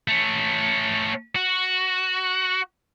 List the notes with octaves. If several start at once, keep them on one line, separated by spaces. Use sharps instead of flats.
A3 C#4
F#4